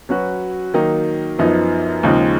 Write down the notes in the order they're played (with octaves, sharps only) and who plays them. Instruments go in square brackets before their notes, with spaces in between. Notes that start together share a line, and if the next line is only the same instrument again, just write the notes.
[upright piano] F#3 C#4 F#4 B4
D#3 F#3 A#3 D#4
F#2 F3 B3 D#4
D#2 C#3 F3 G#3 D#4